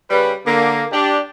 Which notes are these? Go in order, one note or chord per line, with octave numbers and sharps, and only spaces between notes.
C#3 G3 B4
D3 A#3
D4 G4